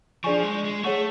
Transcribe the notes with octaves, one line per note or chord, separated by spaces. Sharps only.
F3 D4 G#4 D5 G#5 C#6
G#3
G#3
A3 G#4 C#5 F#5 C#6